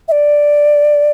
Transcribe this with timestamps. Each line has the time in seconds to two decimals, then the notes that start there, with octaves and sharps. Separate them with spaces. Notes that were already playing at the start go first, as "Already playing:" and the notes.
0.08 E5
0.12 D5